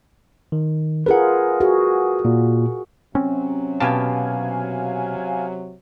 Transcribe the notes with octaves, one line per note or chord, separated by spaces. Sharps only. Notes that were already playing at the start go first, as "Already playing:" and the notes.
D#3
F4 G#4 A#4 B4 F#5
F#4 G#4
A#2
C3 F#3 C4 C#4
B2 G4 F5 G#5 A5